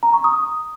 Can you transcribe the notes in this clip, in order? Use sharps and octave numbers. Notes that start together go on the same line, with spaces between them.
A#5
C#6
D#6